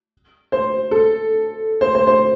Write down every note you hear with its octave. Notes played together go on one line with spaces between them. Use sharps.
C5
A4
C5
C5
C5